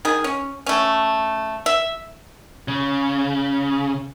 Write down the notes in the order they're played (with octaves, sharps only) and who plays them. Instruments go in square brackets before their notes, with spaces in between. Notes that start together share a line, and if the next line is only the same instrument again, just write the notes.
[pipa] D#3 G#4
C#4
A3 C#4
E5
[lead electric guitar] C#3